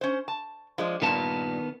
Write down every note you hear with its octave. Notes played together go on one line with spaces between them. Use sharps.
C#4 C5
A5
F3 G#3 D4
G2 A#2 D#3 B3 A5